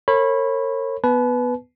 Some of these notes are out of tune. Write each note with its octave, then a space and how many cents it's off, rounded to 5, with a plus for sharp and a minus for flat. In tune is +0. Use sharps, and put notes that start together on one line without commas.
A#4 -40 C#5 -35 B5 +0
B3 +0 B4 +0 A5 -40